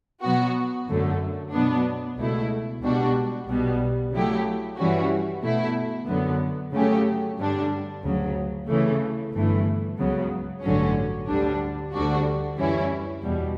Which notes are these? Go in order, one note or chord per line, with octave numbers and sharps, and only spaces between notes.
B2 F#3 B3 F#4
F#2 D3 F#3 A3
B2 F#3 B3 D4
C#2 B2 A3 E4
C#2 B2 G3 D4 F#4
B1 B2 G3 B3
C#3 F#3 A3 E4 G4
G2 E3 G3 C#4 F#4
B2 A3 E4
F#2 D3 F#3 B3
C#3 F#3 A3 C#4 G4
G2 D3 G3 D4
D2 C#3 F#3
C#3 E3 A3
G1 G2 E3 A3
C#2 C#3 F#3 B3
A1 G2 D3 F#3 C#4
D2 D3 G3 D4
D2 D3 G3 D4 F#4
F#2 E3 G3 C#4 E4
E2 B2 G3